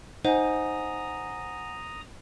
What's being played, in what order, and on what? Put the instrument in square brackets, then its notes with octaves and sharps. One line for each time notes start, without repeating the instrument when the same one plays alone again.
[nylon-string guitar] D#4 [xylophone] C5 [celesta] F#5 G#5 [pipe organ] A#5 D#6